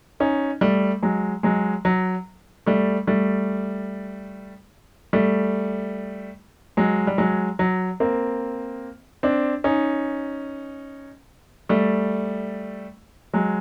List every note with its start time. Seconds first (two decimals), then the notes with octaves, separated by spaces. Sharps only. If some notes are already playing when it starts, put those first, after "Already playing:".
0.20 C#4 D#4
0.61 G3 A3
1.03 F#3 G#3
1.43 F#3 G#3
1.85 F#3
2.66 G3 A3
3.07 G3 A3
5.13 G3 A3
6.77 F#3 G#3
7.07 G3
7.18 F#3 G#3
7.59 F#3
8.00 A#3 C4
9.23 C4 D4
9.64 C#4 D#4
11.69 G3 A3
13.33 F#3 G#3